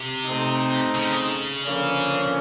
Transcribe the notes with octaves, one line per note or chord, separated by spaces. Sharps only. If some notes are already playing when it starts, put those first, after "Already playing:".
Already playing: C3
A3 C4 D#4
C#3
D3 F3 A#3 C#4